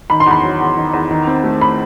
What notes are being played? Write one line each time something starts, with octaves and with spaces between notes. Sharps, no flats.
D#3 B5
C6
E2 B5
F#3
E2
D#3
E2
D#3
C4
A3
B5